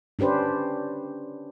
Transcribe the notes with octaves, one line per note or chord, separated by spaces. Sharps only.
C#4 D4 G4 B4 C5